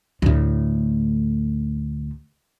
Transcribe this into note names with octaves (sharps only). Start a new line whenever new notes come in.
D2 A2